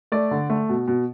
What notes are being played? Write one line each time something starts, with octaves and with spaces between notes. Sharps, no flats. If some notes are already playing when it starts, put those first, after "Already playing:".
A3 D5
D3
A3
B2
B2